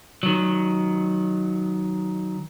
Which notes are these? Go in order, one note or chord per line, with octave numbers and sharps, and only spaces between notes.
D#3 F#3